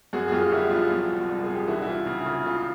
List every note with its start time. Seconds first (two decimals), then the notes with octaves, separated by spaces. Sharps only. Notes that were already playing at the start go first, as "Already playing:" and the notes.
0.13 F#2 F#4 G#4
0.28 G#4
0.32 F#2 F4 G4
0.52 G1 E4 F#4
0.71 F3 F4
0.91 F#3
1.10 C2
1.29 C2
1.44 C2 G#4
1.55 G4
1.67 E3 E4 F#4
1.82 E4
1.87 E3 F4
2.06 C#3
2.20 E4
2.26 C#3 F4
2.46 C#2 F4